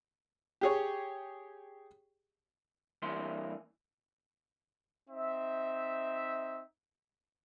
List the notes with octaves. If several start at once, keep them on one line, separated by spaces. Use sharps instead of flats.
G4 G#4 C#5
G2 E3 A#3 C6
C4 D#4 E5